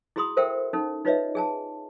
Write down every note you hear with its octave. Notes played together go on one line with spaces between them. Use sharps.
E4 F#4 G#4 B5 C6 D#6
A4 A#4 C5 E5 F#5 G5
C#4 D#4 A4
D#4 F4 B4 C#5 D#5 E5
G#4 G#5 A5